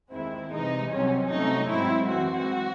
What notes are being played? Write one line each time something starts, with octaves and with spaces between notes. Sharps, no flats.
D#2 D#3 G#3 C4 E4
C2 C3 E3 G#3 D#4
C2 C3 F#3 C4 C#4
C2 C3 F#3 A3 C#4 D#4
G#2 F#3 C4 E4
F#2 E3 G#3 C4 F#4